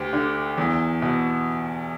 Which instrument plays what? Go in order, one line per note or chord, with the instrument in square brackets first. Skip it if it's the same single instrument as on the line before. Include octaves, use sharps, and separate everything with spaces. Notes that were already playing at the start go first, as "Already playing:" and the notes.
Already playing: [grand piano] D2 G4
D3
E2
B2